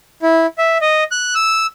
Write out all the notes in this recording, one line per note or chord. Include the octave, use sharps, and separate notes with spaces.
E4
E5
D#5
F#6
E6